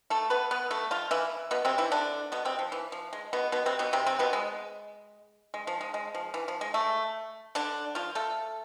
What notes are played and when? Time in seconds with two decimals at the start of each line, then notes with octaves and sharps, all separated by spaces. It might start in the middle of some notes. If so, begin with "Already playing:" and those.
0.10 A3 A4
0.30 B3 B4
0.51 B3 B4
0.71 A3 A4
0.91 F3 F4
1.11 E3 E4
1.51 B2 B3
1.65 C3 C4
1.78 E3 E4
1.92 D3 D4
2.32 B2 B3
2.45 C3 C4
2.59 F3
2.72 E3
2.92 F3
3.13 G#3
3.33 B2 B3
3.52 B2 B3
3.66 C3 C4
3.79 B2 B3
3.93 C3 C4
4.06 C3 C4
4.19 B2 B3
4.33 G#3
5.54 G#3
5.67 F3
5.81 G#3
5.94 G#3
6.14 F3
6.34 E3
6.48 F3
6.61 G#3
6.74 A3
7.55 D3 D4
7.95 F3 F4
8.15 A3 A4